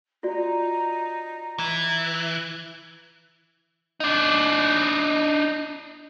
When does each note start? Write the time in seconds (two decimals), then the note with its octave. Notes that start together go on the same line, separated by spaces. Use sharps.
0.23 D#4 F4 F#4 D5
1.59 E3
4.00 D4 D#4